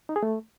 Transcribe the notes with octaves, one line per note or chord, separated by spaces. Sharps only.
D#4
G#4
A3